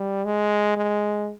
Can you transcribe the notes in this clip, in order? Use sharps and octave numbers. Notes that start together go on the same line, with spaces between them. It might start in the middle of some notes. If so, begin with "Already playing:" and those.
Already playing: G3
G#3
G#3